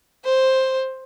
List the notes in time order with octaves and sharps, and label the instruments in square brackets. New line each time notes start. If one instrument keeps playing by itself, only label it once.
[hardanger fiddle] C5